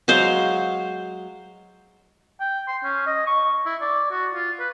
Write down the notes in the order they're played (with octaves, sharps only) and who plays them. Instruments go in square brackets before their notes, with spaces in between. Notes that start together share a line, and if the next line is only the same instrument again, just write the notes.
[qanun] F#3 G#3 C5 F5
[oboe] G5
C6
C#4
D#5
C#6
E4
D5
F#4
F4
B4